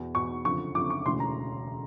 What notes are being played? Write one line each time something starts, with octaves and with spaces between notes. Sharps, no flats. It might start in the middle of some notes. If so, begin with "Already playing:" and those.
Already playing: E2 B2
E2 B2 C#6
F#1 F2 D3 F3 C#6
F#1 F2 D3 F3 D6
C#6
E1 D2 C#3 E3 C6
A#5